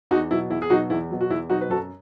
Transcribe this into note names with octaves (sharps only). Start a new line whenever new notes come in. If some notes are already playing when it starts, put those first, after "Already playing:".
E2 D#4 F#4
B2 F#3 E4
E2 E4
G#4
B2 F#3 D#4 F#4
E2 E4
B2 F#3
F#4
E2 E4
B2 F#3 D#4 F#4
B4
F#2 F#4 A4